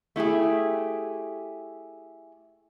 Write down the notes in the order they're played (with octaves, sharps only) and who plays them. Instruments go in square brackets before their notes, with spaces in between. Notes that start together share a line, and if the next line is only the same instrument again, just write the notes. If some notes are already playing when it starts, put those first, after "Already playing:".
[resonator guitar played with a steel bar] A3 E4 G4 G#4